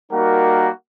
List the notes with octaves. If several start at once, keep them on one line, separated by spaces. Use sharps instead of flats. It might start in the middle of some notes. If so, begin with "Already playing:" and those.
G3 A#3 D#4 F#4 A#4 F#5